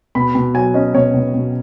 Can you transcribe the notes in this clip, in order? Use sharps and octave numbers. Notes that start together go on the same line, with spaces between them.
B2 B5
B2
F#3 G#5
C#4 D#5
B2 C#5
B2
B2